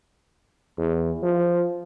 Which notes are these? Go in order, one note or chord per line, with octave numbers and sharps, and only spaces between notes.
E2
F3